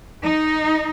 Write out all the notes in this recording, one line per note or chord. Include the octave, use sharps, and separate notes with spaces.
D#4